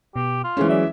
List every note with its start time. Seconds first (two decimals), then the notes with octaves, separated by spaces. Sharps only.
0.16 B2 G4
0.44 F4
0.57 E3 G#3 A3 C4 C#4
0.69 F#3 D5 E5